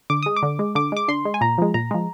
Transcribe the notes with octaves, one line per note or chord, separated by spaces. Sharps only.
D3 D6
G#3 D#6
D6
D3
G#3
D3 D6
G#3 D6
D3 C6
G#3
G#5
A#2 A#5
F3 G#3
A#2 A#5
F3 G#3